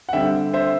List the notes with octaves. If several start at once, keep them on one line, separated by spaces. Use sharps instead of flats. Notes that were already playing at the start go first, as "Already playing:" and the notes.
F#5
D3 G3 C4 E5 G5
C5 E5